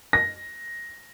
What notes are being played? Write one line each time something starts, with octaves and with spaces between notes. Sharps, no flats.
A#6